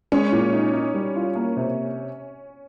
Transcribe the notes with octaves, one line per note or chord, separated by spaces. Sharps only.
G#3 C#4
A#2
D#4
D#4
G3
F4
A#3
C3